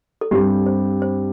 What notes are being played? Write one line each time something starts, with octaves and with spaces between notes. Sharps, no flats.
A4
G2 G3 C4 G4
C5
C5